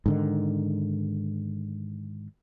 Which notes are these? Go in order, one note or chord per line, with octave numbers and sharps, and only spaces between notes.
G#2 D3 D#3